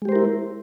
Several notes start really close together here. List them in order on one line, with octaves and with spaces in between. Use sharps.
G#3 G4 C5 A#4 E4